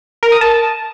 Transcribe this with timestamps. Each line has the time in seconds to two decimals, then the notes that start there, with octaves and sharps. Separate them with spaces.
0.23 A#4
0.32 D#6
0.41 A5